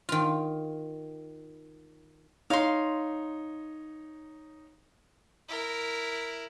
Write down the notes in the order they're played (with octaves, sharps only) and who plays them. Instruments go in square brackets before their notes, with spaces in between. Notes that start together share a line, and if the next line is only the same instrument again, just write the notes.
[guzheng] D#3 F4
[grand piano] D#4 C#5 [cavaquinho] F5 C6
[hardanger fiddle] E4 A#4